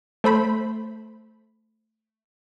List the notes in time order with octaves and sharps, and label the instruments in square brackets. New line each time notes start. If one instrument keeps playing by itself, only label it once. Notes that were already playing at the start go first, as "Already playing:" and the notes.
[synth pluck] A3 C5 B5